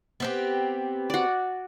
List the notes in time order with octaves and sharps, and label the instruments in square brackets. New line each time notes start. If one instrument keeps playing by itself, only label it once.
[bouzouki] B3 C4 G4
[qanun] F#4 D5